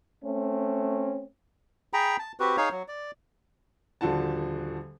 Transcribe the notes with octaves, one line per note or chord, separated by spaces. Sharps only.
A3 C4 C#4
G#4 G5 A#5 B5
A5
C4 F#4 G4 B4
D#4 G#4 C#5 F5
F#3
D5
D#1 D3 F3 F#4 A5